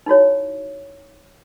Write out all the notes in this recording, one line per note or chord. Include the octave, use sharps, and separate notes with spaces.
D#4 E4 F#4 C#5